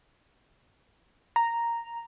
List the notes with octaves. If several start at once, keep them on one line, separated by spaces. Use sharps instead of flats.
A#5